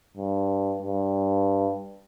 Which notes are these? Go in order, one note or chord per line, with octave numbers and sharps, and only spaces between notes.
G2
G2